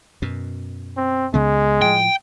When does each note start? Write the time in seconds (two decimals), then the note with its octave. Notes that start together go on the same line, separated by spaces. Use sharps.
0.22 F#2 B2
0.97 C4
1.34 C#2 C#3 G#3 B3
1.82 A2 F3 G5